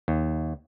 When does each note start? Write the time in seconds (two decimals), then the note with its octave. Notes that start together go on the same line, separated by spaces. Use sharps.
0.08 D#2